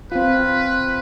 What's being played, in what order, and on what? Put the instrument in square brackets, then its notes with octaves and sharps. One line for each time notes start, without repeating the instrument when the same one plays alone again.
[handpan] C4 F4 [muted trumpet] B4